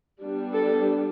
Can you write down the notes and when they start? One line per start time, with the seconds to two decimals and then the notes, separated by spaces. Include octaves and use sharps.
0.21 G3 B3 D4
0.52 A4